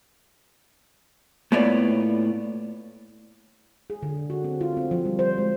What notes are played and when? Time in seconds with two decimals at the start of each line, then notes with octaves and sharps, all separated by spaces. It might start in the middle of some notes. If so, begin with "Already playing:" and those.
1.52 A2 A#3 B3 F4 C#5 D5
3.90 G#4
4.03 D3
4.30 F#4
4.44 C4
4.61 F4
4.77 C4
4.91 F3
5.05 G3
5.19 C5
5.38 G#3